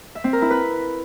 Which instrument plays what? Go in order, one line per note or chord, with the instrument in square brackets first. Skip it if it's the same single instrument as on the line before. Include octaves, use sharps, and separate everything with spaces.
[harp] E5
C4
A#4
E4
B4